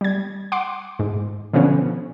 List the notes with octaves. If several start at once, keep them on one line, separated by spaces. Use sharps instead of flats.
G3 G#6
F#5 C6 D6
G#2
B2 D3 F3 B3 C#4